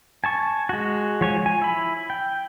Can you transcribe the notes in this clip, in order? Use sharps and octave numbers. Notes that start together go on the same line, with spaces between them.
G#5 A5 C#6
G#3 F#4
F3 C#5 G#5
G#5
E4 B5
G5